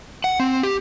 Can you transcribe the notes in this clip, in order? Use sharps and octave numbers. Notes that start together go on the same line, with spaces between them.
F#5
C4
G4